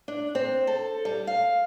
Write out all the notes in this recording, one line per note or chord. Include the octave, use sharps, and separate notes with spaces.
D4
C4
A4
G3
F5